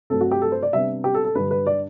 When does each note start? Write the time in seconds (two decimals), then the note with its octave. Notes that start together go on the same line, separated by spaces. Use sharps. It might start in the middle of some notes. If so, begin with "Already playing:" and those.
0.10 G2 F#3 A3 C4 A4
0.21 F#4
0.31 G4
0.42 A4
0.52 C5
0.63 D5
0.73 C3 G3 B3 D4 E5
1.04 G4
1.14 A4
1.25 A4
1.35 G2 D3 G3 B4
1.51 B4
1.67 D5